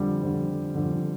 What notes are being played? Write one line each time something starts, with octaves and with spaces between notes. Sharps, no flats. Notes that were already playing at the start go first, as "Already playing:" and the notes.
Already playing: F2 D3 G3
F2 D3
F2 D3